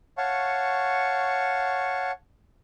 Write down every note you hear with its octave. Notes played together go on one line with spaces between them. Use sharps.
C#5 F5 F#5 A5 C#6